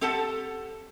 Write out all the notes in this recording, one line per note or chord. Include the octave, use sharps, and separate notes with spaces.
C4 G4 A4 F#5 A5